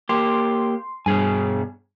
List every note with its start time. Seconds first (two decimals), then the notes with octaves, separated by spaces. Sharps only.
0.09 A#3 G4 C6
1.06 G2 B2 G#4 G#5